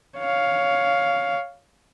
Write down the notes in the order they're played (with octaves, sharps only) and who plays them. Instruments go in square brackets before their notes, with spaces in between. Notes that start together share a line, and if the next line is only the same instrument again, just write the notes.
[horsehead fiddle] C#5 F5